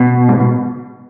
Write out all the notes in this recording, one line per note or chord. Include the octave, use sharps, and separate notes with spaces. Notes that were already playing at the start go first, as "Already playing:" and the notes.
Already playing: B2
G#2
B2